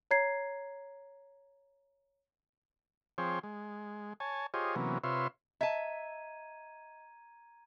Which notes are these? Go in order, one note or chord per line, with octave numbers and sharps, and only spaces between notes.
C#5 A#5 G#6 C7
F3 C4 G#4 C5 C#5 G5
G#3
C#5 G#5 A5
F4 G4 G#4 C5 C#5 D#5
C3 E3 F#3 A#3 B3 C#4
C3 F4 B4 C#5 E5 C6
D#5 E5 A5 A#5 G#6 D#7